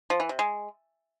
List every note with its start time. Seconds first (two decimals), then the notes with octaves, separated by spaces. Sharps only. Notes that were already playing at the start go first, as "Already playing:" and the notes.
0.10 F3
0.20 E3
0.29 C3
0.39 G#3